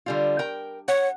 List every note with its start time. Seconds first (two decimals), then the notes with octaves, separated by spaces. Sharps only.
0.06 D3 G3 F4
0.39 A#4 G5
0.88 C#5 F#5